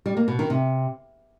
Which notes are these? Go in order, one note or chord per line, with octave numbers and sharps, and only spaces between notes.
G3
A#3
B2
D#3
C3